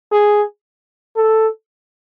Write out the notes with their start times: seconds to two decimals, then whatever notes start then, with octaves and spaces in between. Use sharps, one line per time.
0.12 G#4
1.16 A4